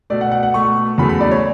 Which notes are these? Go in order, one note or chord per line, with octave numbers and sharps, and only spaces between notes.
B2 A3 D5
F#5
F#5
F#5
B2 A3 C#6
E2 C#3 F#3 A3 B5
B5
D5
C#5